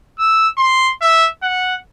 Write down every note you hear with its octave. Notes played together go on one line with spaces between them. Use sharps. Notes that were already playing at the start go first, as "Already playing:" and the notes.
E6
C6
E5
F#5